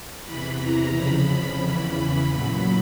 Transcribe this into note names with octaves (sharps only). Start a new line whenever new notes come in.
E2 C3 E3 B5
A#5
F2 C#3 F3 B5
E2 C#3 E3
A#2 F#3